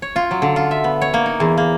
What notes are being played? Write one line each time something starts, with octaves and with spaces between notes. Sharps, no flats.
C#5
F4
F#3
D3
F4
E5
B3
C#5
A#3
D#4
E2
A#3